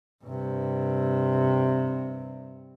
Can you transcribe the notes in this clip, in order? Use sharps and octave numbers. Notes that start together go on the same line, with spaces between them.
G2 C3